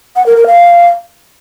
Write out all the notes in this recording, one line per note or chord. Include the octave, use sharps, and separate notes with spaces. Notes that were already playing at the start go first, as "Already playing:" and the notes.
F#5
A#4
A#4
F5